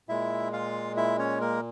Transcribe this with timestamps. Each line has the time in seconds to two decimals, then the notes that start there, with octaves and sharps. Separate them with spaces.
0.09 A#2 G#3 E4 E5
0.53 F4 F5
0.97 E4 E5
1.19 C#4 C#5
1.41 A#3 A#4